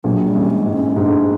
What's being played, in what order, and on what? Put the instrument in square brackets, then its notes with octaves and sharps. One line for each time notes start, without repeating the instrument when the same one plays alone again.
[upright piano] A#1 A#2 [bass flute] F#3
[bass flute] G3
[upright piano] A1 A2
[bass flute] G#3
[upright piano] G#2
[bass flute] C#4
[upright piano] G#2 [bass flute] D4
[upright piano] A2